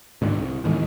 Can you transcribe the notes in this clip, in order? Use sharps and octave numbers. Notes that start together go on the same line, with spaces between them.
G#2 D3 D#3
C2
E2 A2 D#3 G#3